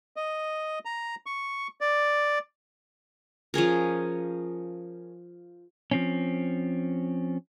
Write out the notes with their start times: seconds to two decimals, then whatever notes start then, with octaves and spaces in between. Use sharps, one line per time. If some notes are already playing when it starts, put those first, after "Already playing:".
0.16 D#5
0.85 A#5
1.26 C#6
1.81 D5
3.54 F3 C#4 G#4 A#4
5.91 F3 C4 C#4